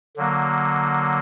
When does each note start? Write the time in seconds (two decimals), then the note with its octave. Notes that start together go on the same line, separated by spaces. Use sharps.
0.17 D3 F#3 A#3